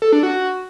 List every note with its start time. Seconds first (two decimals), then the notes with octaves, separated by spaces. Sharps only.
0.02 A4
0.13 D4
0.23 F#4